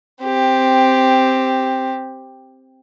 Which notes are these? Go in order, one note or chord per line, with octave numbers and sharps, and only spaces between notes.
C4 G4